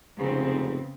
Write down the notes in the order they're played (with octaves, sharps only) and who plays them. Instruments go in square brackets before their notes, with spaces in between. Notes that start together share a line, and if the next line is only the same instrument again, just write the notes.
[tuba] F1 [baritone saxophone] G#2 [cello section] C#3 B3 C4